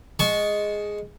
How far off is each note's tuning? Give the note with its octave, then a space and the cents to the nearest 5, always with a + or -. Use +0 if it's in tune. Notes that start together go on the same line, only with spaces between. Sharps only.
G#3 +0 A5 -25 C#6 +0